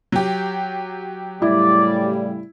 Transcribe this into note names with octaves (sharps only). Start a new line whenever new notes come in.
F#3 G4
A2 C#3 G3 E4 D5